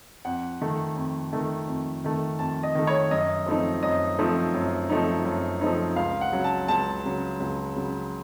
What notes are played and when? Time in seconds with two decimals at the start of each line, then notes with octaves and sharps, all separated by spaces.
0.25 F2 F#5
0.61 D#3 A3
0.96 F2
1.33 D#3 A3
1.68 F2
2.04 D#3 A3
2.39 F2 A5
2.63 D#5
2.75 D#3 A3
2.87 C#5
3.11 F#2 D#5
3.46 F3 A3 C4 D#4
3.83 F#2 D#5
4.19 F3 A3 C4 D#4
4.54 F#2
4.90 F3 A3 C4 D#4
5.25 F#2
5.61 F3 A3 C4 D#4
5.96 C#2 F5
6.21 F#5
6.33 C#3 F#3
6.44 A5
6.68 C#2 A5
7.05 C#3 F#3
7.40 C#2
7.76 C#3 F#3